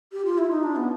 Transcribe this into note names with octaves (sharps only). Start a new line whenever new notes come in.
G4
F4
E4
D#4
D4
B3